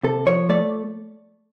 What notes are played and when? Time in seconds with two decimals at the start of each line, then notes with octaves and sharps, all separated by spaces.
0.03 C3 A4
0.26 F3 C#5
0.49 A3 D5